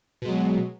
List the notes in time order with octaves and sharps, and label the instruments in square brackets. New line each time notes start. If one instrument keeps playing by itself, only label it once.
[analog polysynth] B2
G#3
F#3